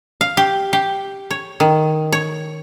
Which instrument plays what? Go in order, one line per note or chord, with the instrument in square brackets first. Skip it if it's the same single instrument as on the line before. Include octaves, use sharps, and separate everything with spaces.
[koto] F5
G4
G4
C#5
D#3
C#5